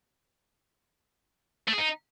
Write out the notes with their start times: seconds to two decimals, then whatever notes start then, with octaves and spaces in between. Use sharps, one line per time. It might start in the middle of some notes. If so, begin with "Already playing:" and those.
1.68 A3
1.73 G#4
1.78 D#4